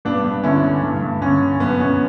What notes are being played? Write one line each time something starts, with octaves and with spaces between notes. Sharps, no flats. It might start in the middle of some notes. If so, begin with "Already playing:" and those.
G2 B3 D4
G2
D3 C#4 E4
D3
G2
G2
D3 C#4
D3
F#2 B3
F#2 C#4